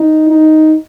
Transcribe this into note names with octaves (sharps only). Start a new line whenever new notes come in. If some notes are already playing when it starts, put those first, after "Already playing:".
Already playing: D#4
D#4